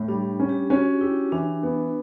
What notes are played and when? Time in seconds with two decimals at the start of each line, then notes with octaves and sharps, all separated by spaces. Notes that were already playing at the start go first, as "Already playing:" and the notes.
Already playing: A2
0.08 G3 D4
0.40 C#4
0.49 G4
0.70 C#4 F#4
1.01 E4 G4
1.32 E3 D4
1.63 B3